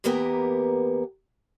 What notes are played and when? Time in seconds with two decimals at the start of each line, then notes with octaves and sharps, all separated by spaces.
0.04 E2 E3 A#3 B3 G4 A#4